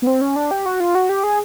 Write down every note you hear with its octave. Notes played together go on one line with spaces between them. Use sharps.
B3
C4
C#4
D4
G4
F#4
F4
F#4
G4
G#4